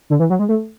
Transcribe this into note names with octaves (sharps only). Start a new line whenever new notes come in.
D3
E3
F#3
G#3
A3